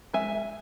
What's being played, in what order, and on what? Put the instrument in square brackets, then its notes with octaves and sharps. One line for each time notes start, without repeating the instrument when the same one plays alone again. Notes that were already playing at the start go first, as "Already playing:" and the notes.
[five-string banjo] G#3 E5 G#5